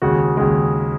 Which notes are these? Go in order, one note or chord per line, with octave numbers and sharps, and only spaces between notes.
D#2 C#3 G#3 F#4
D#2 C#3 G#3